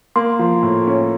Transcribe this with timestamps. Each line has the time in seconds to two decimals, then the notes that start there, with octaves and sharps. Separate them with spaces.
0.16 A#3 C6
0.39 F3
0.63 A2
0.87 C#4